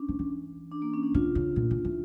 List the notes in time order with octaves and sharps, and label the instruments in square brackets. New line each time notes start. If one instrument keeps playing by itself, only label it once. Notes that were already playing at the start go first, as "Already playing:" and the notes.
Already playing: [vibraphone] C#4 D4
[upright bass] F3
E3
[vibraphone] D4
A#3
C#4
D4
[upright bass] D3 [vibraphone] F4
[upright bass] C#3
A#2
C#3
E3